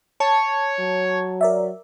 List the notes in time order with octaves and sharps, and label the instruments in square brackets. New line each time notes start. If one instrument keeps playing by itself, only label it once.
[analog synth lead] C#5 [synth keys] A5
[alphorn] F#3
[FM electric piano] A#4 D5 E5